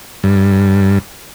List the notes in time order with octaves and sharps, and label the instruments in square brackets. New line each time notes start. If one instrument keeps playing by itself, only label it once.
[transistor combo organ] G2